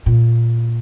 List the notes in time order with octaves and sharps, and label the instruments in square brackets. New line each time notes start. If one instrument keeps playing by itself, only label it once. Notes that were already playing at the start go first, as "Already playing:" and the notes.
[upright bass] A#2